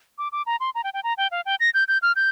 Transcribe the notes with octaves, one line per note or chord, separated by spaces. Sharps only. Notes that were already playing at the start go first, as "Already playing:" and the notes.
D6
D6
A#5
C6
A#5
G5
G5
A#5
G5
F5
G5
A#6
G6
G6
F6
G6